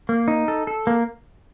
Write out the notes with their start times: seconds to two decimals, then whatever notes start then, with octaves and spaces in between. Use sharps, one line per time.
0.09 A#3
0.28 D#4
0.48 A4
0.67 A4
0.87 A#3